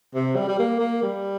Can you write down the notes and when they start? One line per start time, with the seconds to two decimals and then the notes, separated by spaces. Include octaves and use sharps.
0.14 C3
0.36 G3
0.48 G3
0.59 A#3
0.80 A#3
1.02 G3